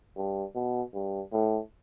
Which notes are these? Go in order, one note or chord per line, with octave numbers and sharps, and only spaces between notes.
G2
B2
G2
A2